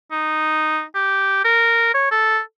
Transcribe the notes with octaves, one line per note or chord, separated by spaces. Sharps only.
D#4
G4
A#4
C#5
A4